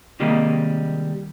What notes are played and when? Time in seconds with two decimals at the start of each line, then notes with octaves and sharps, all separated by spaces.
0.20 C3 D#3 G3 G#3 A#3 D#4